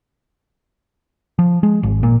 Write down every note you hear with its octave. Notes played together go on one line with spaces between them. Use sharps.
F3
G#3
G#1
A#2